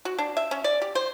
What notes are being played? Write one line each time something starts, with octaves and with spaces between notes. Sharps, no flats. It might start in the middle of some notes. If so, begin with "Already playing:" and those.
F#4
D4
E5
C#4
D5
G4
C5